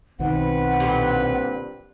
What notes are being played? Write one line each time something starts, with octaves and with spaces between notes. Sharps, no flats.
B1 B2 D#3 C4 B4 F#5
A#2 D3 G3